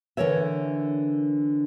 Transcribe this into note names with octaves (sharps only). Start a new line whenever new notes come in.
D3 E3 A#4 C#5 E5